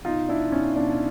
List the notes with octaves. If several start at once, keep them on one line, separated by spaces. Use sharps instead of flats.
B2 D#4 F4
B2 D4 E4
B2 C#4 D#4
B2 D4